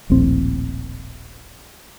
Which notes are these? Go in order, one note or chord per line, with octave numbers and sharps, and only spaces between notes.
D#1 A#1 A2 C4